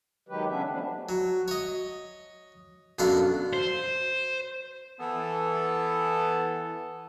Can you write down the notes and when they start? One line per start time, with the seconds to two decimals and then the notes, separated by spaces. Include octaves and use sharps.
0.29 D#3 F#3 G#3 G4 B4
0.49 C#3 B3 C#4 D4 E5
0.70 F3 G3 A3 B3 D4
1.09 F#3
1.48 C#5 D#5
2.99 F#2 B2 D4 A4 D5 F5
3.53 C5
5.00 E3 B3 A4